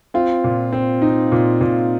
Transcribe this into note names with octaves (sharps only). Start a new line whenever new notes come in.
C4 F4
A#2
C4
D#4
A#2
A#2